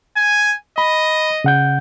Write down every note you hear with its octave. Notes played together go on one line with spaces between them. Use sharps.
G#5
D#5 B5
C#3 F#5 G6